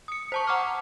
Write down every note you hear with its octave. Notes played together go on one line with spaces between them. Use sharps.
D#6 C#7
C5 A5 C#6
F#5 A#5 C#6 D6 F6